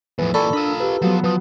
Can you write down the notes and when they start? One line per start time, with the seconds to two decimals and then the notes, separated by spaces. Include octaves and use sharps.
0.19 E2 A2 F3 B4
0.34 A#2 E3 A4 D5 B5 C#6
0.53 D4 F4 A#4 B5 D#6 E6
0.80 G4 B4
1.02 F3 F#3 B3
1.24 F3 B4 D#6